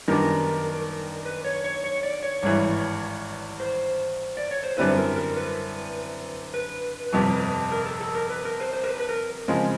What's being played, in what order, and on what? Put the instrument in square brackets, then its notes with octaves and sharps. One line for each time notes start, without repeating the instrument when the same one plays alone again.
[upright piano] F#2 D#3 G3 B3 D4 [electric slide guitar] A#4
[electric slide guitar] B4
C#5
C#5
C#5
D5
C#5
[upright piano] G#1 G2 E3 [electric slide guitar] C#5
[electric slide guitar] C5
D5
C#5
C5
[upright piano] F#2 D3 G3 C4 E4 [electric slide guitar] B4
[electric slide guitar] A#4
A#4
B4
B4
[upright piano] G1 F2 C3
[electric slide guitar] A#4
A4
A4
A#4
B4
A#4
C5
C5
A#4
B4
B4
A#4
[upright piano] C#3 F3 G#3 C4